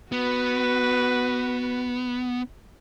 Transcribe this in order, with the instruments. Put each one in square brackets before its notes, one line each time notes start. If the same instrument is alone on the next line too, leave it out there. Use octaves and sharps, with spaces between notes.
[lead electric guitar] B3 [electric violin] F#4 B4